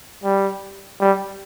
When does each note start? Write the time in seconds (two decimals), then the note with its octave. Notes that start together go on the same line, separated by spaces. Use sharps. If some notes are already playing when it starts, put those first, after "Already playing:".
0.24 G3
1.01 G3